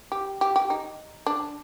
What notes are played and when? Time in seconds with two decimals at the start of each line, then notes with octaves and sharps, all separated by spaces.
0.12 G4
0.41 G4
0.56 G4
0.70 D#4
1.26 D4